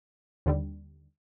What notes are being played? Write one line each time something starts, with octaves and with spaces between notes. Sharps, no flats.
D#2 D3 G3